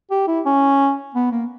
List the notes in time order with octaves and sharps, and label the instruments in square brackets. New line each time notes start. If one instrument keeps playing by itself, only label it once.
[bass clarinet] G4
E4
C#4
B3
A#3